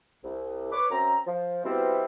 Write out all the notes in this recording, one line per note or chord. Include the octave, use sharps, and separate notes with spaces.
C2
B4 C#5 D6
F#2 C4 A#5
F3
B2 G3 C4 E4